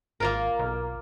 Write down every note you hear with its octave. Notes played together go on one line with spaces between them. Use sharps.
G#1 A#3 F4 A#4
B1